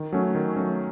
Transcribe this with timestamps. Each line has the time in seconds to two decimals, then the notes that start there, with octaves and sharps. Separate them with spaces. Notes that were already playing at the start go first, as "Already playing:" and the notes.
Already playing: D#3
0.12 F#3 A3 C#4
0.35 D#3
0.56 F#3 A3 C#4